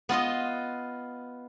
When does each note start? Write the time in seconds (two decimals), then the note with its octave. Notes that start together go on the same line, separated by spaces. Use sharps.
0.09 B3 F4 D#5 C6